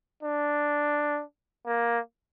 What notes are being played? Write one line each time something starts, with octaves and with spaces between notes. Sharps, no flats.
D4
A#3